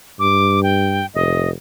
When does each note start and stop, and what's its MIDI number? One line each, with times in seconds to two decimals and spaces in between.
0.19 1.02 43
0.19 0.62 86
0.63 1.06 79
1.15 1.51 29
1.15 1.49 75